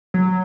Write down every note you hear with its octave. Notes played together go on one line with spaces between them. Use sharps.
F#3